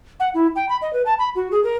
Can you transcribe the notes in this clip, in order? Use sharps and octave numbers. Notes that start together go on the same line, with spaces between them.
F#5
E4
G5
B5
D#5
B4
A5
B5
F#4
G#4
A#4